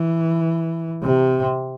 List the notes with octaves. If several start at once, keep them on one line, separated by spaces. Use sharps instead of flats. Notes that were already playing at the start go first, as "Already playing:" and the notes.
Already playing: E3
C3